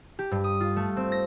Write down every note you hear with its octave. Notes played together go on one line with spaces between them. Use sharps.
G4
G2
D#6
F4
A3
C4
A#6